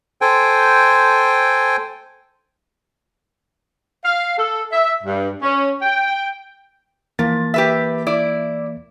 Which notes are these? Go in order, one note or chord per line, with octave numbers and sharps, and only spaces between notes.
A4 C5 G5 G#5
F5
A4
E5
G2
C#4
G5
E3 F3 A#3 A6
G4 B4 E5
E4 D5